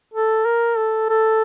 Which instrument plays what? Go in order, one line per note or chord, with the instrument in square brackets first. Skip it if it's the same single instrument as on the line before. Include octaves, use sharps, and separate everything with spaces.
[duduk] A4
A#4
A4
A4